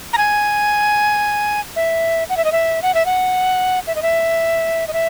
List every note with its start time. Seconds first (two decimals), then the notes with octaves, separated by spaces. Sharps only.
0.13 A#5
0.18 G#5
1.76 E5
2.30 F#5
2.37 E5
2.45 D#5
2.52 E5
2.82 F#5
2.94 E5
3.06 F#5
3.87 E5
3.95 D#5
4.02 E5
4.88 D#5
4.93 E5